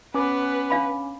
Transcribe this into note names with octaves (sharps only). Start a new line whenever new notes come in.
B3 C#4 B4 D6
D4 F5 B5